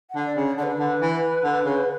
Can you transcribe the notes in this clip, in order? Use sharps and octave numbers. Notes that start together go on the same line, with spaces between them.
F#5
D3
D5
C#3
D3 D5
B4
D3
E3
D3
C#3